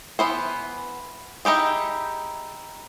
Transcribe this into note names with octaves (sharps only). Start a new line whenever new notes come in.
E3 B3 C5
D#4 E4 G4 G#4